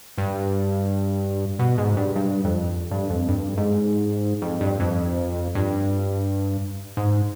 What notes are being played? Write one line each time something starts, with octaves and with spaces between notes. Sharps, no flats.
G2
B2
G#2
G2
G2
F2
G2
F2
G2
G#2
F2
G2
F2
G2
G#2